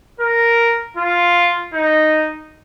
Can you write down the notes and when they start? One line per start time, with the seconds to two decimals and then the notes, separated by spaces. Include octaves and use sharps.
0.20 A#4
0.97 F4
1.73 D#4